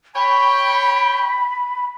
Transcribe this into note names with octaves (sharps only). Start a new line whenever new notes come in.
C#5 G5 B5